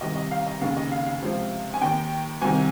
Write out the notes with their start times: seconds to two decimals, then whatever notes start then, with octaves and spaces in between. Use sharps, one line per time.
0.01 C2 C3 D#3 D#5
0.16 D#5
0.31 F5
0.46 D#5
0.61 F1 D#2 C#3 F5
0.77 D#5
0.92 F5
1.06 F5
1.22 C#2 C3 F3
1.74 G#5
1.81 D#2 D#3 G5
2.41 C2 C3 D#3 G#5